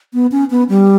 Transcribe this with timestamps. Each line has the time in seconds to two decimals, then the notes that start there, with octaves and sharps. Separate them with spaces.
0.14 B3
0.32 C#4
0.51 B3
0.69 G3